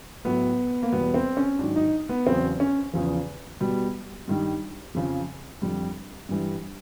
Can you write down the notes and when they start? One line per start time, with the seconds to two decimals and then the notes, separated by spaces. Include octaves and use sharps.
0.25 A2 F#3 B3
0.83 A#3
0.92 E2 B2 G3 B3
1.14 C4
1.37 C#4
1.59 G#2 D#3 F#3 D4
1.76 D#4
2.09 B3
2.27 E2 C#3 F#3 C4
2.60 C#4
2.93 E2 C#3 F3
3.61 B2 G3
4.28 G2 D#3 G3
4.95 F2 C#3 F3
5.62 F2 D3 G3
6.29 G2 E3 G3